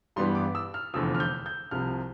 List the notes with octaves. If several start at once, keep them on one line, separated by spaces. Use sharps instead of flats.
G2 E3 G3 B3 C6
D6
E6
F6
F1 E2 D3 F3 E6
F6
G6
G6
C2 C3 F3 F6